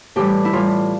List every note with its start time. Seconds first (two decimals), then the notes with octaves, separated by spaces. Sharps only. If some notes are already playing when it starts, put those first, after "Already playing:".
0.16 A2 E3 G3 G4
0.45 E4
0.53 A2 E3 G3 F4